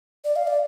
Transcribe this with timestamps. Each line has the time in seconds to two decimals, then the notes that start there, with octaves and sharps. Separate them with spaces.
0.25 D5
0.36 F5
0.47 D5